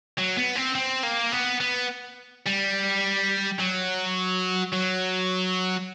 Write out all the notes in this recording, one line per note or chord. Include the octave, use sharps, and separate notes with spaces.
F#3
B3
C4
C4
A#3
B3
B3
G3
F#3
F#3